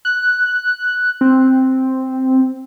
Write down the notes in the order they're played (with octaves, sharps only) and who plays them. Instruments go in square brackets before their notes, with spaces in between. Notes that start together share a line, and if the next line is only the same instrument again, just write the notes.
[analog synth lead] F#6
C4